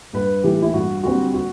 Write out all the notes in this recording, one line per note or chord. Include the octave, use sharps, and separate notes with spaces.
G2 B4
E3 A3 G4
E4
G2 F#4
D3 G3 C4 F#4
F#4